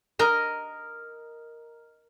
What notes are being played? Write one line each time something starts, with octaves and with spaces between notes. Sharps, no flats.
A#4 D#5